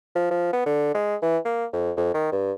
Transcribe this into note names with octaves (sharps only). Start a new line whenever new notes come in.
F3
F3
B3
D3
G#3
E3
A#3
F2
F2
D#3
G2